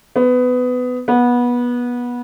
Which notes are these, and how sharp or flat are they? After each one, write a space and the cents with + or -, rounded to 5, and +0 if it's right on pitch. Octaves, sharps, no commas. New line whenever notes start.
B3 +20
B3 -20